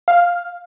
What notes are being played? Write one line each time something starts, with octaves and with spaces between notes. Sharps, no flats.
F5